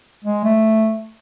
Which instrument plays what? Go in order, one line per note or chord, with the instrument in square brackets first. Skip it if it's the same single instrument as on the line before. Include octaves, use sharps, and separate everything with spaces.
[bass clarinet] G#3
A3